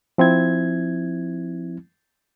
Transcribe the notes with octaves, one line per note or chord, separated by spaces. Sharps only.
F3 C4 E4 G#6